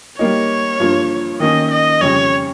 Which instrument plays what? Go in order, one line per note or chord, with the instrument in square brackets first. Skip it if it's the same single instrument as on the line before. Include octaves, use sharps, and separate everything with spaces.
[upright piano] G3 A#3 D#4 [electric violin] C#5
[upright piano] G2 F3 A#3 F4
[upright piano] D#3 A#3 C#4 [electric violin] D#5
[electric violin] D#5
[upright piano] F2 C#3 G3 [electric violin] C#5